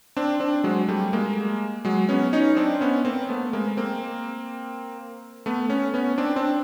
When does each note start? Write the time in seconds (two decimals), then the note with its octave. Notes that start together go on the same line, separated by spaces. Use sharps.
0.16 C4 D4
0.40 C4 D4
0.64 F#3 G#3
0.88 G3 A3
1.13 G#3 A#3
1.85 F#3 G#3
2.09 B3 C#4
2.33 C#4 D#4
2.57 C4 D4
2.81 B3 C#4
3.05 A#3 C4
3.29 A3 B3
3.53 G#3 A#3
3.77 A#3 C4
5.46 A3 B3
5.70 B3 C#4
5.94 B3 C#4
6.18 C4 D4
6.36 C4 D4